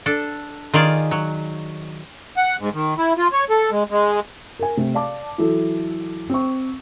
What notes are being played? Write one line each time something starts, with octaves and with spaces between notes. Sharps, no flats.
D4 A4
D#3 F4 G#4 D5
F#3
F#5
G#2
D#3
E4
F4
C#5
A4
G#3
G#3
A#4 G#5
C3 A3
D5 F5 A5 D6
E3 F#3 E4 A4
C4 C#6